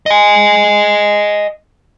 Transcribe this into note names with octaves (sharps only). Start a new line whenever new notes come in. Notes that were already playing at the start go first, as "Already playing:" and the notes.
D#5 G#5